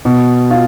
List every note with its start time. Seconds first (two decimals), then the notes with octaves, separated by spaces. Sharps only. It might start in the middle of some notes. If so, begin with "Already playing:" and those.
0.05 B2
0.51 F4